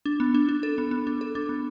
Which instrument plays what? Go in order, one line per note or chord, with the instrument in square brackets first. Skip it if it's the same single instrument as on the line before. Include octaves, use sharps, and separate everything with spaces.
[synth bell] D4
B3
D4
D4
A4
B3
B3
D4
A4
D4
B3